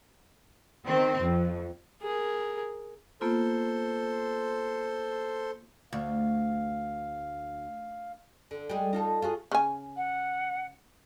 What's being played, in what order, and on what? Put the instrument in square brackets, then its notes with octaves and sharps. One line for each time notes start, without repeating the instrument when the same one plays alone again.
[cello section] D#3 C4
F2
[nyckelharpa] G#4 A#4
[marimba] A#3 B3 F4 [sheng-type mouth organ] A4 C5 C6
[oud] D2 [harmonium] F5
[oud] D3
G3 G#3 G#4
D#4 F4 A4
F4 F#4 G#4
[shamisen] C#3 G#5
[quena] F#5